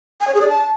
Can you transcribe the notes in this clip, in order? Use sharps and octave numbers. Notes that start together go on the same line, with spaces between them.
G#5
C#5
G#4
D5
A5